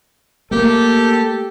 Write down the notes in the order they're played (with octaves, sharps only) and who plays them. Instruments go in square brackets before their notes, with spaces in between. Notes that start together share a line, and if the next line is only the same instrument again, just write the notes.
[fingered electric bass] A3 A#3 [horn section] G4 A4